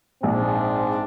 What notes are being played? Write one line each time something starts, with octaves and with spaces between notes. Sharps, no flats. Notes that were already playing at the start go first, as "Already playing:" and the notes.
A#1 G#2 C4 D4